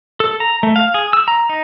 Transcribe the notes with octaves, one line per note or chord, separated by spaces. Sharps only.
A4
A#5
A3
F5
G#4
E6
A#5
D#4